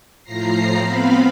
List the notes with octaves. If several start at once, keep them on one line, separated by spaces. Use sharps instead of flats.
A2 F3 A#5 A#6 C7
B3 C4 F5 B5